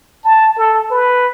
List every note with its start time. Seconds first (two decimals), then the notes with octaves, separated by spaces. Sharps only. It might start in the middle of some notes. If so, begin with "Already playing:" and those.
0.24 A5
0.58 A4
0.91 B4